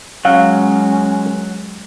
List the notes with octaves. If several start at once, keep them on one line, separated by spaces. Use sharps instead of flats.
F#3 G#3 C#4 F5